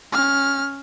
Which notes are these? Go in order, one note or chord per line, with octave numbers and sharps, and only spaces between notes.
C#4 F6